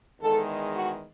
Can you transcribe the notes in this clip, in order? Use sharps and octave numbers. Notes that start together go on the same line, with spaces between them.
E2 D#3 G#3 A4
F#4